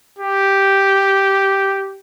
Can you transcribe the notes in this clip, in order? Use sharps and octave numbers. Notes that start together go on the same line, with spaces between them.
G4